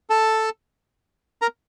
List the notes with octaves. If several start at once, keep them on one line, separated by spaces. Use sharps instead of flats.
A4 A5
A#4 A#5